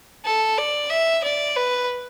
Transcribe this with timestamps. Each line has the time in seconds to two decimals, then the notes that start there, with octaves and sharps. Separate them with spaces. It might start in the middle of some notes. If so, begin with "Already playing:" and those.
0.25 A4
0.58 D5
0.90 E5
1.23 D5
1.56 B4